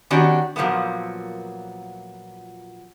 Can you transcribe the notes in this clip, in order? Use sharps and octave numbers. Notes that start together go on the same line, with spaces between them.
D#3 B3 C#4 D4 F#4 G4
A#2 F3 F#3 A#3 B3